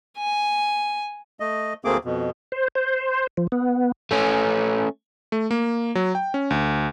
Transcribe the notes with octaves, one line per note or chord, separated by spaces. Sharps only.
G#5
A3 D#5
D2 A3 A#3 C4 G#4 D6
F2 B2
C5
C5
F3
B3
A3 C#4
A3
A#3
F#3
G5
C#4
D2